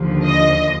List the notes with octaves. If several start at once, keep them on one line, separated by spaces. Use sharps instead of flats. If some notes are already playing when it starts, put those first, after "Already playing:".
Already playing: D#2 D3 F3
D#5